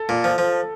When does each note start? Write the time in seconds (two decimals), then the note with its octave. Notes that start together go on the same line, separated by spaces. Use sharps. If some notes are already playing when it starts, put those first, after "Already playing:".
Already playing: A4
0.09 A#2
0.24 F3
0.38 F3